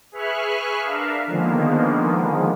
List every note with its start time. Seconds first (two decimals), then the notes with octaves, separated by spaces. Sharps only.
0.12 G#4 B4 E5 C#6 F6 F#6
0.80 D4 A#4 E5 F5
1.27 D3 D#3 F3 G#3 A#3 B3